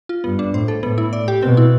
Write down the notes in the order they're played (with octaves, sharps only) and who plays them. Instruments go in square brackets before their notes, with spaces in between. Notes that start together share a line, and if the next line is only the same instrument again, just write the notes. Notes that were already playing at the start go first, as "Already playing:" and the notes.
[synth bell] F4
[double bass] G2 [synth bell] B3
[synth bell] D4
[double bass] A2 [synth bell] C5
[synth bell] A4
[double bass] A2 [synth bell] B3
[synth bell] E4
D5
G4
[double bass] B2 [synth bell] C4
[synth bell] E4